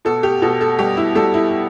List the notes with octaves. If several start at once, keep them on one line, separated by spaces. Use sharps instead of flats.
B2 A4
G4
B2 A4
A4
G3 G4
E4
G3 A4
E4